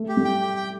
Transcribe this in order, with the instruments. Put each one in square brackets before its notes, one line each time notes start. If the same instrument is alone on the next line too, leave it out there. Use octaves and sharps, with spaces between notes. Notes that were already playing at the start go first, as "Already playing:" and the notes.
Already playing: [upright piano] A3
[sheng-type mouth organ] G4
[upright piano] G3
[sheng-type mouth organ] G5
G4
G5